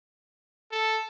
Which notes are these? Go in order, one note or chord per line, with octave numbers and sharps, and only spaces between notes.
A4